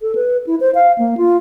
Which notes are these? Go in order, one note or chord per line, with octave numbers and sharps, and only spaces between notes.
A4
B4
E4
C5
F5
A#3
F4